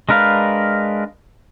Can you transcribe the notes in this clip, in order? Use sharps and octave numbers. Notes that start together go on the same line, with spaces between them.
G#3 D4 A#4 B4 F5